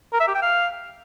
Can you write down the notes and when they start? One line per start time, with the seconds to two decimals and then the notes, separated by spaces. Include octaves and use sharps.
0.13 A#4
0.20 E5
0.28 G4
0.35 G5
0.42 F5